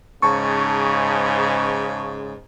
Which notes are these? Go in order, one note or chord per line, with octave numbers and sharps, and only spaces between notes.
G#2 C#3 A5 C#6